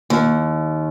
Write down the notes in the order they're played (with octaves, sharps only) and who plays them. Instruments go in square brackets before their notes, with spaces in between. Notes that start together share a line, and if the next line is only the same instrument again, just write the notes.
[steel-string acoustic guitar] D#2